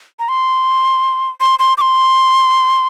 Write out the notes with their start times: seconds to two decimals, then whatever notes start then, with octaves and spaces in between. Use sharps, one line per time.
0.19 A#5
0.29 C6
1.41 C6
1.59 C6
1.78 D6
1.81 C6